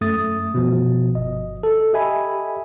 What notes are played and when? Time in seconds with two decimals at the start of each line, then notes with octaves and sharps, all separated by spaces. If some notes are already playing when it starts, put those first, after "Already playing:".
0.01 F#2 A3 D#6 A6
0.54 B2 F3
1.11 G1 D#5
1.63 A4
1.93 G4 D#5 E5 G#5 B5